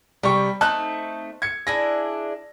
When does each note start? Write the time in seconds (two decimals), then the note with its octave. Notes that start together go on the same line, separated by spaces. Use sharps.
0.23 C3 G3 G5 C#6
0.61 A3 C4 D#4 A5 F#6
1.42 G#6 C#7
1.67 D4 E4 G#4 A#6